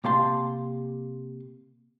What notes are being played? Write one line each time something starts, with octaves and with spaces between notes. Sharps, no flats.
C3 A#3 G4 F5 A5 C6